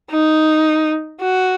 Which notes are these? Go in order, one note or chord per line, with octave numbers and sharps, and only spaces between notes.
D#4
F#4